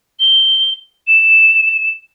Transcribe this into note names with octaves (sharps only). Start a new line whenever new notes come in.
G7
E7